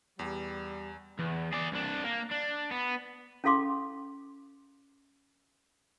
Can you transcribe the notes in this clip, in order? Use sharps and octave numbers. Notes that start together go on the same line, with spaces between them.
E2 G3
E2
G#4 D5
C2 D4
A#3
D4
B3
C#4 E4 A4 F5 C6 D6